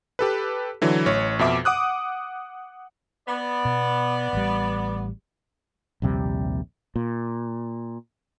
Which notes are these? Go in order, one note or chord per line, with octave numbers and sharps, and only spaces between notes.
G4 A4 B4
D3 E3 F#3
A1 C#5
F2 B2 E5 D6
F#5 D6 D#6 F#6
B3 D5
B2
A1 G3
A#1 D#2 C3 G3
A#2